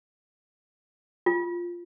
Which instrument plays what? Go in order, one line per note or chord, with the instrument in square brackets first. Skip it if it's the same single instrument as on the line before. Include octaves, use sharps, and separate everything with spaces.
[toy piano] F4